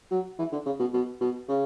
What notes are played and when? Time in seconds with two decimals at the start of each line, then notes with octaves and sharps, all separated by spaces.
0.11 F#3
0.38 E3
0.52 D3
0.66 C#3
0.79 B2
0.93 B2
1.21 B2
1.48 C#3